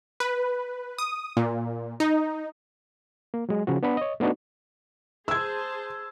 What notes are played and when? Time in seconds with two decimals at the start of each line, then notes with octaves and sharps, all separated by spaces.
0.20 B4
0.98 D#6
1.37 A#2
2.00 D#4
3.34 A#3
3.49 F#3 G#3
3.67 C#3 F3 F#4
3.83 B3 D4 F#5 B5
3.97 C#5 D#5
4.20 A3 B3 D4 D#4 F#4
5.28 G#4 C5 A5 E6 G#6